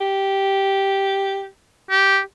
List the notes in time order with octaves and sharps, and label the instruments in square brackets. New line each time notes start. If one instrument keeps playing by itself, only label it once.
[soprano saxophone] G4
[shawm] G4